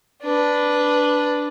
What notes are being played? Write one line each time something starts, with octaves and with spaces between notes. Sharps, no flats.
D4 B4